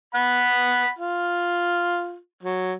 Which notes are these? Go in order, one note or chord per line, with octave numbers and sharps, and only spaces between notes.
F#5 B5
F4
F#3